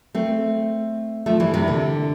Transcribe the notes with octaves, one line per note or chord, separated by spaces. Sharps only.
A3 C4
F3 A3
E3 G3
C3 E3
D3